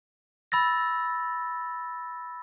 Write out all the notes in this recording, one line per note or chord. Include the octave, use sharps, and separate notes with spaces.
B5 E6 A6 A#6